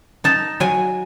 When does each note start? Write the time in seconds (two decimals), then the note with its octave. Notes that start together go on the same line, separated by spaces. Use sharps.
0.24 D#4 A5
0.60 F#3 G#5